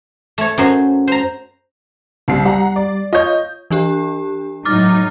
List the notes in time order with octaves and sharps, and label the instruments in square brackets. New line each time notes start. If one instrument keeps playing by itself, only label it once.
[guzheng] A3 C#5
F#2 F#3 C5
C5 A#5
[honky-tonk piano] C2 C4 C7 [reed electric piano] C#3 G3
[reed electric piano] G3 [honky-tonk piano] F#5 A#5
[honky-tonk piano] D5
[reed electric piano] F4 C#5 [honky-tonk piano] D#5 G6
[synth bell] E3 D4 G4
[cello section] A2 F#3 D#4 [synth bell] D6 F6 A6